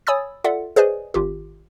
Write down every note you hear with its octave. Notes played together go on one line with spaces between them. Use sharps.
C#5 G#5 B5 D#6 E6 A6
F4 A4 D5 E5 F#5
G#4 B4 C5 D5 D#5 G#5
G#1 F4 G4